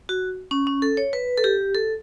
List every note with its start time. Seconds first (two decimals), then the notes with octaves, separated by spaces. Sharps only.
0.09 F#4
0.51 C#4
0.67 C#4
0.82 A4
0.97 C#5
1.13 B4
1.37 A4
1.44 G4
1.75 A4